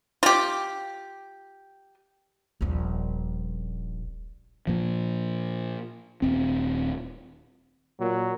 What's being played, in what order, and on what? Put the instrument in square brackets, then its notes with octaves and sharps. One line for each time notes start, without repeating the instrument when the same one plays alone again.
[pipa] F4 G4
[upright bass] D#1 A#1
[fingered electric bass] A#2 F3
D#1 C4
[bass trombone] A#2 [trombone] F#3